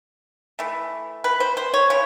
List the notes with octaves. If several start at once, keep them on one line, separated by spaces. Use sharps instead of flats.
E3 A3
B4
C5
C5
C#5
C#3 E3 C#5